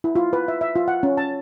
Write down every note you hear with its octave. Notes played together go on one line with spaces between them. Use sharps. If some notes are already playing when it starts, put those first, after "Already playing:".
E4
F4
B4
E5
E5
F4
F#5
C#4
A5